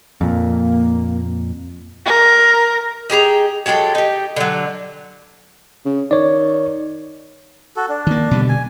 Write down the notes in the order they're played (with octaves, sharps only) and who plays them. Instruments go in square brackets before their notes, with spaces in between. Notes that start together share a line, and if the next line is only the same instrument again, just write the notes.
[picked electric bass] F2 A#2 [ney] A#3
[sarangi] A#4
[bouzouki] D#4 G4 G#4 A#5
F#3 G#3 G4 A4
D#4 G4
D3 F#3
[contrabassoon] C#3
[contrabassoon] D#3 [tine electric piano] C#5 D5
[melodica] F#4 A4
D4
[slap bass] D#3 A#3
B2 D3 G3
[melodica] G#5